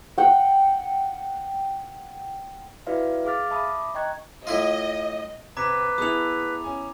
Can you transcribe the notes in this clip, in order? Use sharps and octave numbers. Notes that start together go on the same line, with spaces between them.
F#5 G5
E4 F#4 B4 D5 E5 F5
G#4 F5 D6 F6 A6
E5 A5 B5 D6 D#6
D#5 G5 A#5 C#6 F#6 G#6
A2 E4 F4 D#5
C3 C4 B4 A#5 D6 G#6 B6
B3 E4 G#4 A4 D#6 F7
C#4 G#5